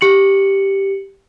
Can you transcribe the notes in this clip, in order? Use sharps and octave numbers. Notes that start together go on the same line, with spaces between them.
G4 C#7 F#7